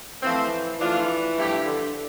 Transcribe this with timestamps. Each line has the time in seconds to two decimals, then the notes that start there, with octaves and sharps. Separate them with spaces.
0.23 E3 F3 A3 C4
0.80 E3 F3 A3 D4 F4
1.37 G2 F3 A3 E4 G4
1.66 D3